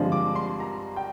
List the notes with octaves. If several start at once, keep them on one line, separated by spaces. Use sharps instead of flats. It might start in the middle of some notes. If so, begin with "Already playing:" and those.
Already playing: G2 D3 F3 G#3 C4
D6
C6
A#5
G5